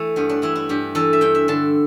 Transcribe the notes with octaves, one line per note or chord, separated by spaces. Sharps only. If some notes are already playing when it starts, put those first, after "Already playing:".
Already playing: E3 A3
G2 B3
D4
E3 E4
E4
G2 G4
E3 A4
E5
G2 G5
E5
D3 A5